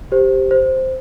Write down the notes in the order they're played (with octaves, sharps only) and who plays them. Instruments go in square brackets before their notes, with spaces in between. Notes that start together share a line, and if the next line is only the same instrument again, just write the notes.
[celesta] G4 C5
C5